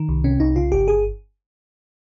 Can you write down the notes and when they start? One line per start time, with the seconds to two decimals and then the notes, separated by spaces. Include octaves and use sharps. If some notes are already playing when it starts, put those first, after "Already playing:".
Already playing: D#3
0.09 C2
0.24 C3 C#4
0.40 C2 D#4
0.56 C#3 F4
0.72 G1 G4
0.88 G#4